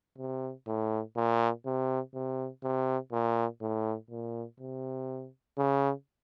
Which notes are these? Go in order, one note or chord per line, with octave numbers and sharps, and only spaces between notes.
C3
A2
A#2
C3
C3
C3
A#2
A2
A#2
C3
C#3